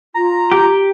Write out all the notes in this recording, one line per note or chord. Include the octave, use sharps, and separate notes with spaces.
F4 A#5
G4